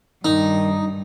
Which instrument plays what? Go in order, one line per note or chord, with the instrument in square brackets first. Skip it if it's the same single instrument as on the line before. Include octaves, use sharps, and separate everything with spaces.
[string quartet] G2 [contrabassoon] D#3 [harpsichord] D#4